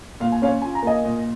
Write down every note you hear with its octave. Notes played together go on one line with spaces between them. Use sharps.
A#2 F5
G#5
C#4 C#5 F5
F4 G#5
A#5
A#3 D#5 G#5
A#2